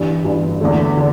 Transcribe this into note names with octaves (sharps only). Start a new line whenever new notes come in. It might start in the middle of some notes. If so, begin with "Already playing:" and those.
Already playing: G1 G2 E3
G1 G2 E3
E2 D3 A3
D3